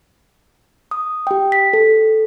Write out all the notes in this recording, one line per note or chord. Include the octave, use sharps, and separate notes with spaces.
D#6
G4 G5
B6
A4